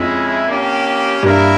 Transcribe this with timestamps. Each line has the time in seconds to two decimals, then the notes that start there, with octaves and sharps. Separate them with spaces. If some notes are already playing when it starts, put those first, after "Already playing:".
Already playing: F2 G#3 C#4 E4
0.47 A#3 C#4 G4
1.23 G2 A#3 E4 A#4 F5